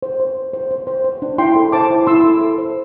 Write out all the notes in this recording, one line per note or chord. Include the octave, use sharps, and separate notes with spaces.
C5
C5
C5
C5
C5
C5
C5
D4
E4 G5 C6
A4
C5 A5 D6
E4
E4 C6 E6
A4
A4
C5